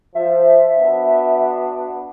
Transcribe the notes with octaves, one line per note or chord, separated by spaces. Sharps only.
F3 E5
B3 D4 F#4